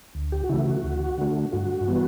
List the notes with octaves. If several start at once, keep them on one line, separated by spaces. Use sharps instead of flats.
D2
G4
F#4
C#3 E3 A3 E4
F#4
D2
D3 A3
G2 F#4
E3 G3 B3